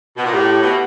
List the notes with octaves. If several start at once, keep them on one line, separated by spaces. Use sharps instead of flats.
B2
A#2
A2 G4
B2